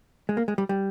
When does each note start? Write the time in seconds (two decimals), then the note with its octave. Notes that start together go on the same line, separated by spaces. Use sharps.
0.29 G#3
0.37 A#3
0.48 G#3
0.58 G3
0.69 G3